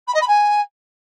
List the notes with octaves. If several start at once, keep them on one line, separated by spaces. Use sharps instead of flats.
B5
D#5
B5
G#5